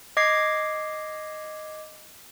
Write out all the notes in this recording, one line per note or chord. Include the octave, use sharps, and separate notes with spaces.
D#5 D6 G#6 C7